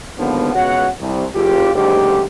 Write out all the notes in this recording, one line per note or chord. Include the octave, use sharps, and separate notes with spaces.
D#2 G#2 D3 F3 B3
C#2 B2 F#4 C#5 F#5
C2
F#1 F4 G4
F#1 D2 G#2 G4